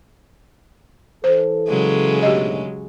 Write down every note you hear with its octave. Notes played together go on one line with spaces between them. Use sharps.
E3 A4 C5
C#3 F#3 G#3
D2 G#2 B2 G4 D#5